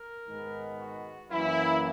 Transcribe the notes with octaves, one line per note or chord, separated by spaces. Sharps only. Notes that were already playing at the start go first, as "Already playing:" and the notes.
Already playing: A#4
G#2 D#3 G#3 B3
F#4
F#2 E3 A#3 E4